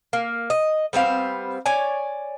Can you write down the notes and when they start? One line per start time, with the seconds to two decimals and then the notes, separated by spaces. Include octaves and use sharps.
0.13 A#3
0.50 D#5
0.93 G3 B3 C4 F5
1.66 C#5 D5 G#5